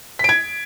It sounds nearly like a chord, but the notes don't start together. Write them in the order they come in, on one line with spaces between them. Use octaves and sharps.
B6 D7 G#6